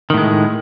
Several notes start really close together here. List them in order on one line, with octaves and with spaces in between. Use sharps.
D#3 A2 G#3